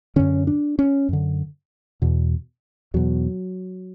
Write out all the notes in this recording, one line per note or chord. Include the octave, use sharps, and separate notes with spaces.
F#2 D3 C#4
D4
C#4
F#2 D3
E2 B2
E2 B2 F#3